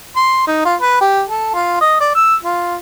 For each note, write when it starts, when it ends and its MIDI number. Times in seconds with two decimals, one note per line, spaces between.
0.16 0.43 84
0.47 0.63 63
0.65 0.75 65
0.81 0.97 71
1.01 1.22 67
1.29 1.52 69
1.54 1.76 65
1.81 1.96 75
2.01 2.15 74
2.15 2.35 88
2.43 2.76 65